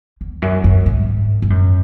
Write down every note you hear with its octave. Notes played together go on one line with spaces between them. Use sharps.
E2
F#2
F#2
G#2
G#2
F#2